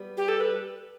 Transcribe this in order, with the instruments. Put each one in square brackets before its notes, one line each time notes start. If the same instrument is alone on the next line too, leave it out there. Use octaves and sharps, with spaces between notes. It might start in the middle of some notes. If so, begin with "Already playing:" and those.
Already playing: [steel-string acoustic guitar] G3 B3
[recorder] G4
A4
B4